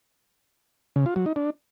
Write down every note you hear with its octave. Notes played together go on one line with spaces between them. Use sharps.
C#3
F4
F#3
D#4
D4